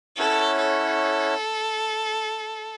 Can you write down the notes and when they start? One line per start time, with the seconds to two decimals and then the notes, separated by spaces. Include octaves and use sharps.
0.17 C#4 E4 A4 C#5 F#5
0.59 A4